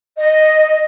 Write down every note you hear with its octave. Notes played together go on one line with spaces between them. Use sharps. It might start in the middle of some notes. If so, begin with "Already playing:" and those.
D#5